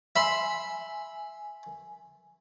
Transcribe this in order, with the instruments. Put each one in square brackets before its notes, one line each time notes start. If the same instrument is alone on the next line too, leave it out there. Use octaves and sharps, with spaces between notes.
[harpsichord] E5 B5 C6 [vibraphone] G#5